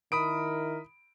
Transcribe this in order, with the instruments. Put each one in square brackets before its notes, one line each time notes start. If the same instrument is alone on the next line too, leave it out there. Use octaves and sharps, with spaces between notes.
[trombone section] D#3 E4 A#4 [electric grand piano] B5 D#6 D7